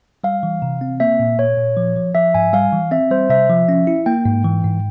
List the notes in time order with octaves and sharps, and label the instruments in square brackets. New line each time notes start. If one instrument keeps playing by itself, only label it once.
[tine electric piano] G3 [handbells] F5
[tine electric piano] E3
C3
C4
[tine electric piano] A#3 [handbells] E5
[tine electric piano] A#2
[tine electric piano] A#2 [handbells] C#5
[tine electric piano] A#2
F3
F3
[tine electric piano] F3 [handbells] E5
[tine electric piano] G#2 [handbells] G#5
[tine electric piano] G3 [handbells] F5
[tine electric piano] E3
[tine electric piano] C4 [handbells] E5
[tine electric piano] G3 [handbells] C5
[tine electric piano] C3 [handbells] E5
[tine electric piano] F3
C#4
E4
[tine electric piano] A#3 [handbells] G5
[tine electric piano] G#2
E3
G#2